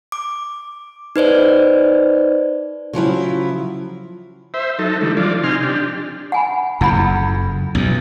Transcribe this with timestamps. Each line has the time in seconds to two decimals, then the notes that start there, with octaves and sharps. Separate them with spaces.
0.12 D6
1.16 D#4 B4 C5 D5
2.93 C#3 F3 F#3 E4
4.54 C5 E5
4.79 F#3 D#4 A4
5.01 D3 E3 G3 A3
5.17 F3 F#3 F4 D5
5.44 C3 D#4 G#5 C6 F6
5.63 D4 G4
6.32 F#5 G#5 B5
6.81 F#1 F2 E4 F#5 B5
7.75 B1 E2